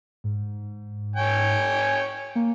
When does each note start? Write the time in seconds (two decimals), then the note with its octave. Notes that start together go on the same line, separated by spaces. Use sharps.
0.24 G#2
1.16 C#5 G5 G#5
2.35 A#3